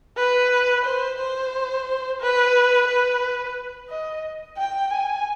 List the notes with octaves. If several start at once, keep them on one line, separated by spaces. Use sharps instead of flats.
B4
C5
C5
B4
B4
D#5
G5
G#5